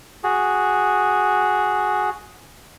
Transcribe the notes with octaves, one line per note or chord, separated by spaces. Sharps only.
F#4 G#4